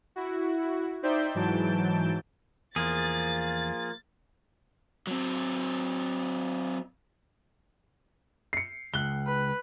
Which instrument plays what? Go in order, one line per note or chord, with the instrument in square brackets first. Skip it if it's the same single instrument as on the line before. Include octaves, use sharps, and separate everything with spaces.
[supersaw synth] E4 F#4
D#4 C5 D5 E5 G5 G6
G#2 E3 F#3 A5 G6 D7
[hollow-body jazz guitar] E2 [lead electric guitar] F3 A#3 [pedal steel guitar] G#4 [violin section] A6
[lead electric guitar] F#3 C4
[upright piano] C7 C#7
[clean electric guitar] C#2 [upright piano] F#6 G7
[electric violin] B4